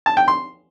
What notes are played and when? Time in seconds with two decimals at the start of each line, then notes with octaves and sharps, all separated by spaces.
0.06 A5
0.17 G5
0.28 C6